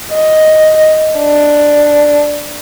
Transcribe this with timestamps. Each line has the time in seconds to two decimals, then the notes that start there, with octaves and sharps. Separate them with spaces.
0.14 D#5
1.18 D4